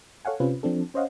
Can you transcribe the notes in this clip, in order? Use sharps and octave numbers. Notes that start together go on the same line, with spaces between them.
A4 C#5 F5 F#5 G#5
C3 C4 C#4 F4 B4
F3 C4 D4 A4
C#4 C5 C#5 D#5 F5 F#5